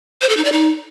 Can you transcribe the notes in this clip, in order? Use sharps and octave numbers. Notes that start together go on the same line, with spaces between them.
C5
A4
D#4
D5
D#4